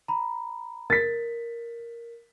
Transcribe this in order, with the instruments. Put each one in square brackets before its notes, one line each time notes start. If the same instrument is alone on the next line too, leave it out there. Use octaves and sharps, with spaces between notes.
[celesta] A#5 B5
[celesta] A#4 [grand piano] A6 B6